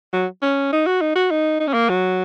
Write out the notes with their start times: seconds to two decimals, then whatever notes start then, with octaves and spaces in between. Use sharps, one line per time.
0.13 F#3
0.42 C#4
0.73 D#4
0.87 F#4
1.01 D#4
1.16 F#4
1.31 D#4
1.60 D#4
1.67 C#4
1.74 A#3
1.89 F#3